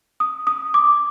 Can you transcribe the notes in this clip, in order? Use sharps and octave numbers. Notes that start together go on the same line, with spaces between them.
D#6
D#6
D6